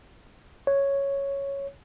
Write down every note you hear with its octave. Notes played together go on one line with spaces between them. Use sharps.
C#5